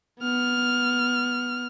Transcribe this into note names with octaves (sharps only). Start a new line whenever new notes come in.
B3 F6